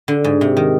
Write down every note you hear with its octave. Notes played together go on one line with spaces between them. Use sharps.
D3
G#2
C3
D#3